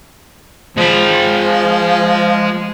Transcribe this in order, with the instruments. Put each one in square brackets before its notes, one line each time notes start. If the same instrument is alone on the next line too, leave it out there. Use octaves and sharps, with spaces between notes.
[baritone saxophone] F3 [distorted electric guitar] G#3 B5